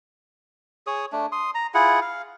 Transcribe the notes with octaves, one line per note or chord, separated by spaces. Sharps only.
G#4 C#5 D#6
A3 D4
C6 D#6
A#5
E4 F4 G#4 F#5
F5